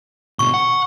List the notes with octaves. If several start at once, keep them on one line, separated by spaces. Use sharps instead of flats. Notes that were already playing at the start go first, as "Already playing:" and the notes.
B2 D3 C#6
F#5